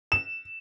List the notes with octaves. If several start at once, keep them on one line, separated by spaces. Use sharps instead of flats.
E7